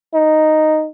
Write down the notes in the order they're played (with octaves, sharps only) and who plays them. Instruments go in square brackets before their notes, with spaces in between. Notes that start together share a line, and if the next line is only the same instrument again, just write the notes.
[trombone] D#4